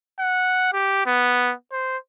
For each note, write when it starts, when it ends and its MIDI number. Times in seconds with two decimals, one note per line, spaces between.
0.19 0.69 78
0.73 1.04 67
1.06 1.53 59
1.72 1.97 72